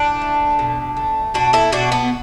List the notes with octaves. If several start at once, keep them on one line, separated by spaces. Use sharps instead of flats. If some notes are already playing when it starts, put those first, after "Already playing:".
Already playing: A2 D4
A3
B2
A3
B2 D4 F#4
E4 A4
B2 D4 F#4
B3